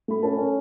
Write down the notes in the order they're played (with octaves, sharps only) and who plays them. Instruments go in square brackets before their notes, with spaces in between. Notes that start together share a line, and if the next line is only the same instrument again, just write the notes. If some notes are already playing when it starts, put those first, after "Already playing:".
[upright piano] A3 B5
C#4 A4 A5
C#4